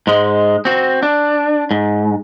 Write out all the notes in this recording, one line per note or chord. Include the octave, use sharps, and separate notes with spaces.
G#2 G#3
C4 F#4
D4
G#2